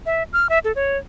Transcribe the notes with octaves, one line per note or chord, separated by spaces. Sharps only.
E5
F6
E5
A4
C#5